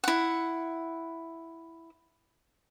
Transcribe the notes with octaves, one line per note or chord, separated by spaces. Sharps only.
E4 F#5